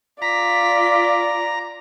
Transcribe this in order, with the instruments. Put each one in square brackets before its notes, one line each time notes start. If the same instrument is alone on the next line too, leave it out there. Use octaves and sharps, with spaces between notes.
[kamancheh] F4 D5 [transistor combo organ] A#5 [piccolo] B6